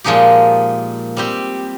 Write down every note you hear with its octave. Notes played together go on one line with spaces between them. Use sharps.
A#2 F3 G#3 D#4 G4
G3 C4 G4